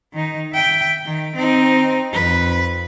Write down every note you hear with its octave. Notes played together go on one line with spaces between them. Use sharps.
D#3 D#4
E5 G5
D#3
C4 D#4
F2 B4